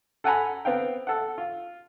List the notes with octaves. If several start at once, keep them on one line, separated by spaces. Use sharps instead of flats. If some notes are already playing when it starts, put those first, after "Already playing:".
A4 F#5 G#5 A#5 B5
B3 C4 F5 G5
A4 F#5
F4